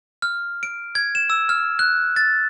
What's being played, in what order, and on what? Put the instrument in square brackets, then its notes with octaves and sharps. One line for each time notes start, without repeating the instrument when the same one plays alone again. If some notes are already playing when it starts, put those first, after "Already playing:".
[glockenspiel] F6
D7
G#6
E7
E6
F6
F#6
A6